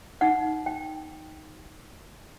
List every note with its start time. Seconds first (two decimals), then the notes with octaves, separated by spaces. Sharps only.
0.21 D#4 F#5
0.66 D#4 G5